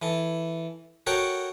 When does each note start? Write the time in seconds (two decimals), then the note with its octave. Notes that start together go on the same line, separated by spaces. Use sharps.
0.02 E3 A4
1.07 F#4 A4 A#4 C#5 F#5 G5